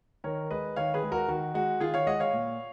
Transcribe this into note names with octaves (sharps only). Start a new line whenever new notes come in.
D#3 A#4 C#5
G#3 B4 D#5
D#3 C#5 F5
G#4 B4
G#3
F#4 A#4
D#3 F#4
G#3 F#4
D#3 F4 G#4
C#5 F5
G#3 D#5 F#5
C#5 F5
A#2